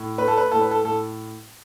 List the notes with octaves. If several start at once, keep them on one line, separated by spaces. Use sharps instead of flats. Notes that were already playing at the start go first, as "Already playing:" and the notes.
Already playing: A2
A3 B4
A4
B4
A2 A4
B4
A4
A2 A4